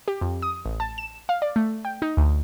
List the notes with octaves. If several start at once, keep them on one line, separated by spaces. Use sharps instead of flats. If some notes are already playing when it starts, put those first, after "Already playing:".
G4
F2
D#6
A1
A5
E7
F5
D5
A3
G5
D#4
D2